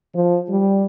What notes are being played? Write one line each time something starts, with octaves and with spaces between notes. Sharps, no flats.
F3
G3